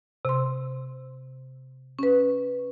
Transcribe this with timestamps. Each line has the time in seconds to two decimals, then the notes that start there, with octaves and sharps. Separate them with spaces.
0.25 C3 C6
1.99 C#4 B4